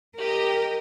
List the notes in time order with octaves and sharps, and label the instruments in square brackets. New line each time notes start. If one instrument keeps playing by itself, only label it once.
[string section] G4 D#5 [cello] A#4